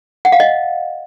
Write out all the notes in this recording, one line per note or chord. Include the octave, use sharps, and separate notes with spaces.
F#5
F5
D#5